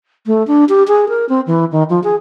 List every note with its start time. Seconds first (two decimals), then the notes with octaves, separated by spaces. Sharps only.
0.26 A3
0.47 D4
0.69 G4
0.88 G#4
1.09 A#4
1.29 C4
1.47 E3
1.72 D#3
1.90 F3
2.04 G#4